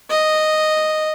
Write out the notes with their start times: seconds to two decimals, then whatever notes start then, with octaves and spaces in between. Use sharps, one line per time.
0.10 D#5